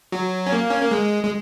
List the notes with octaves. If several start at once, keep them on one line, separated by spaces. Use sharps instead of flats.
F#3
C#4
A#3
C#4
A#3
G#3
G#3